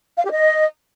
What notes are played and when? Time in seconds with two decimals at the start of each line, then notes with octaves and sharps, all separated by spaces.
0.17 F5
0.24 G4
0.31 D#5